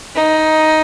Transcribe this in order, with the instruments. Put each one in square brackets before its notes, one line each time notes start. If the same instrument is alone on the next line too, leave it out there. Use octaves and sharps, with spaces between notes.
[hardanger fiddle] D#4